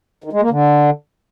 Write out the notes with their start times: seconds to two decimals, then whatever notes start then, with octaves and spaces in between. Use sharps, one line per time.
0.24 D#3
0.33 G#3
0.42 A#3
0.50 D3